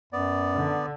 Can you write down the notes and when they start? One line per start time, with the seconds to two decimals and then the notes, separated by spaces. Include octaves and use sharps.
0.13 F#2 B3 D5
0.56 D3